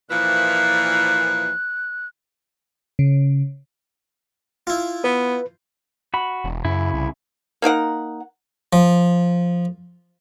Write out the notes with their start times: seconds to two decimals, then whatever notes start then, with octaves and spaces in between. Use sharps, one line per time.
0.11 A#2 E3 F3 F#6
2.99 C#3
4.67 E4 F4
5.04 B3 B4
6.14 F#4 B5
6.44 E1
6.65 F#2 C#3 E4
6.94 C2
7.62 A#3 D#4 A#4 F#5
8.73 F3